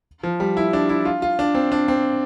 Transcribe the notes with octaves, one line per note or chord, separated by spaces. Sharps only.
F3
G3
E4
D4
E4
F4
F4
D4
C4
D4
C4